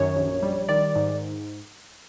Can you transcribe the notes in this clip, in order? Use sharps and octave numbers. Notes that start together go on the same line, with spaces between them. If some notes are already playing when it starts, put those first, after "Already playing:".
Already playing: F#2 D#3 C#5
A#1
G3
D#3 D5
G#2